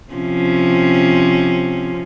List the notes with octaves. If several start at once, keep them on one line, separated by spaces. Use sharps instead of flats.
C3 F3 C#4